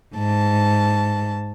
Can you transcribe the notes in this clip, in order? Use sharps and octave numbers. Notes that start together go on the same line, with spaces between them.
G#2 A5